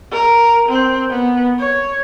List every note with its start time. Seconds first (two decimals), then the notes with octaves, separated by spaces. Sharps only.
0.12 A#4
0.69 C4
1.10 B3
1.59 C#5